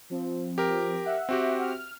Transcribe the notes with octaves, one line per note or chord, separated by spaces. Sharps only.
F3 C4
G4 A#4
E5 F#5
C4 F#4 G4
F6